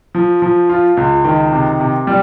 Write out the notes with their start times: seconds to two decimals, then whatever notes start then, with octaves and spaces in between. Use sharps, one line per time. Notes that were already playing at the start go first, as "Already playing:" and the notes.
0.15 F3
0.42 F3
0.69 F4
0.97 C#2
1.25 D#3
1.52 C3
1.80 C3
2.07 G3